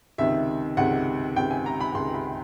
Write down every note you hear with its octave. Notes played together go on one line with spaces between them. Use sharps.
C#2 C3 D#3 E5
C#2 C3 D#3 F#5
C#2 C3 D#3 G5
G#5
A#5
B5
C#2 C3 D#3 C6
B5